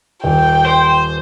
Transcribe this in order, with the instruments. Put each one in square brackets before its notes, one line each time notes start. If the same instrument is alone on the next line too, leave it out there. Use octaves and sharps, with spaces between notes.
[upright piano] D#1 [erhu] G5
[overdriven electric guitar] C5